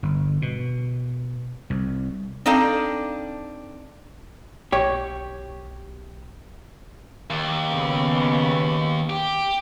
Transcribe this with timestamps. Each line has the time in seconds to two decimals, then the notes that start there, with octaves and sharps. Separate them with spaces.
0.03 G1
0.42 B2
1.70 C2
2.46 C4 D4 D#4 A4 F5
4.72 B1 G4 C#5
7.30 D#2
7.71 C#3 B3
9.10 G4